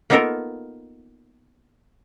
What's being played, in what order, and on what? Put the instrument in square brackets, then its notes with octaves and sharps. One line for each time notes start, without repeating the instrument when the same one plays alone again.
[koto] A#3 B3 D#4 F4 A4 A#4